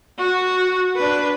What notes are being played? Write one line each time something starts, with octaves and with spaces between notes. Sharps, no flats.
F#4
D4 B4